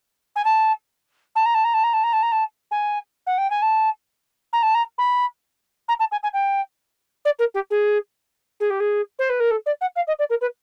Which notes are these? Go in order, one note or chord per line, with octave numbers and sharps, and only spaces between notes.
G#5
A5
A5
A#5
A5
A#5
A5
A#5
A5
A#5
A5
A#5
A5
G#5
F#5
G5
G#5
A5
A#5
A5
A#5
B5
A#5
A5
G#5
G#5
G5
D5
A#4
G4
G#4
G#4
G4
G#4
C5
B4
A#4
A4
D5
F#5
F5
D#5
D5
A#4
B4